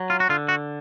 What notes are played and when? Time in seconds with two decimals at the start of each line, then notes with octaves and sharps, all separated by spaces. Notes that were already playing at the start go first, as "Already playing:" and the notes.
Already playing: F#3
0.10 F4
0.20 F#4
0.29 D3 F4
0.48 F#4